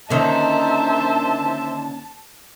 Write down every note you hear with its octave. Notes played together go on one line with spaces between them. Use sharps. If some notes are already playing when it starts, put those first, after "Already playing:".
D3 D#3 A#3 C#4 D#4 C5 E5 A5